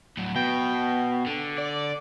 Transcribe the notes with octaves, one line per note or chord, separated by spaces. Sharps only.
A2 F#3
B2 G5
D3
D5